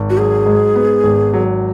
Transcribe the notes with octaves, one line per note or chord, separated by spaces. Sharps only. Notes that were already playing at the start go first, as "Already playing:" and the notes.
Already playing: G#1
F#4
F#3 G#4
G#2
B3
G#1
F#3